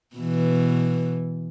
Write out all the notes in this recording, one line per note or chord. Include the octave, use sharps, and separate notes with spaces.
B2 E3